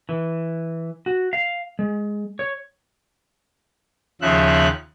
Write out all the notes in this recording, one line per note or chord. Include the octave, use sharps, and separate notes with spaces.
E3
F#4
F5
G#3
C#5
D#2 C#3 F3 E5 F#6